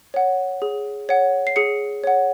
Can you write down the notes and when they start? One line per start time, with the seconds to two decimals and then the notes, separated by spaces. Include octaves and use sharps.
0.14 C#5 F#5
0.62 G#4
1.09 C#5 F#5
1.47 C7
1.56 G#4 C#7
2.04 C#5 F#5